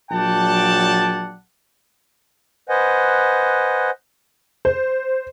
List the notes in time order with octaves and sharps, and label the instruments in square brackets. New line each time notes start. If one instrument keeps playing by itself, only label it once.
[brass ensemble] A#1 F#3 D5 F#5 G5 A5
[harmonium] B4 C5 D#5 F#5 G#5
[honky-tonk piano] C5